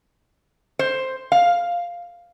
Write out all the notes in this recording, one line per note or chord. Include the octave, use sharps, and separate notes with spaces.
C5
F5